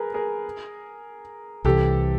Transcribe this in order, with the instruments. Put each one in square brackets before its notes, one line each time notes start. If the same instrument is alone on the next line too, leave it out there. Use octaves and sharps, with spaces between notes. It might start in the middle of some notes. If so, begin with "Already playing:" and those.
Already playing: [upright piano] G#4 A#4 B4
G#4 A#4
[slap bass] C2 C3 E3 [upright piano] G4 A4